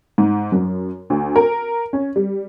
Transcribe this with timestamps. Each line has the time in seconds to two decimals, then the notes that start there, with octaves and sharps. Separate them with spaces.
0.18 G#2
0.52 F#2
1.10 D2
1.36 A#4
1.93 C#4
2.16 G3